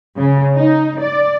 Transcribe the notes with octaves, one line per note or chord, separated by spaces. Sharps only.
C#3
D#4
D5